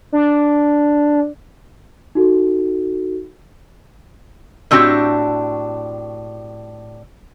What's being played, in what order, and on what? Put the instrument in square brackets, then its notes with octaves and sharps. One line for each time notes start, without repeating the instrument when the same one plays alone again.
[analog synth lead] D4
[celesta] D#4 F#4 A4
[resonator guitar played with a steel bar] A2 C4 D4 F#4 G4